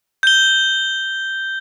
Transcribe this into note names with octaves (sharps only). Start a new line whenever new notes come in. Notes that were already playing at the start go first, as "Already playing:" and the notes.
G6 G7